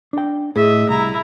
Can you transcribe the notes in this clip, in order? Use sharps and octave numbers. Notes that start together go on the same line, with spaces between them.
D4 G5
A2 G#4 D#5 E5
C2 E4 A#5